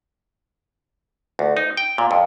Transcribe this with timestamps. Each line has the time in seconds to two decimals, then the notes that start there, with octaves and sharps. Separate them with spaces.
1.39 D2
1.57 D#4
1.77 G5
1.98 A#2
2.11 F2